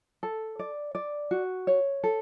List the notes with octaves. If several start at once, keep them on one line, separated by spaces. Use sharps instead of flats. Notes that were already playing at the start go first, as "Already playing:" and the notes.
A4
D5
D5
F#4
C#5
A4